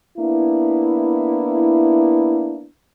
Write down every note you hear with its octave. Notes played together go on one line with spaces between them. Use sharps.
A#3 B3 D4 E4